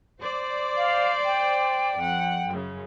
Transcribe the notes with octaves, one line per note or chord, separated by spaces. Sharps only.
C5 D5
F5
G5
F2 F#5
F#2 C#3